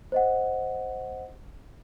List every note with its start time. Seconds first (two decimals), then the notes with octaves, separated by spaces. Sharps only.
0.12 C5 D#5 F#5